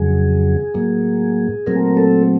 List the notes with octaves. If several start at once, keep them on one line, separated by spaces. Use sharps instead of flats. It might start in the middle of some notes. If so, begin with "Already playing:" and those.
Already playing: F2 C#3 F#3 G#4
A2 F#3 A#3
A#2 F#3 A3 C4 A#4
A4